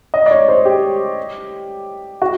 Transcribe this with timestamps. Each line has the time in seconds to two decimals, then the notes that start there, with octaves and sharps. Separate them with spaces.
0.14 D#5
0.26 D5
0.31 C#5
0.48 C5
0.65 G4
2.22 F#4